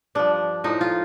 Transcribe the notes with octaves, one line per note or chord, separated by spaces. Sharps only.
G2 F3 D4
A2 F3 D#4
F4